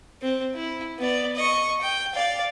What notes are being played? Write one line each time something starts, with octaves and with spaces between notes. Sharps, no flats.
C4
E4
B3 D5
D#5 C#6
G5
D5 F5